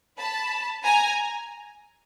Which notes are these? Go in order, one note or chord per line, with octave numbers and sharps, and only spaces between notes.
A5 B5
G#5 A#5